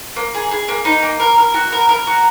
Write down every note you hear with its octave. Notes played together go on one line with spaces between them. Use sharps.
A#3
G#4
G#4
A#3
D#4
A#3
A#4
A#4
F#4
A#4
A#4
F#4